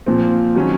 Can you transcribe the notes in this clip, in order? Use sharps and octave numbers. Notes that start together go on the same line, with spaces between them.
A#2 F3 C4
D#3 F#3 C#4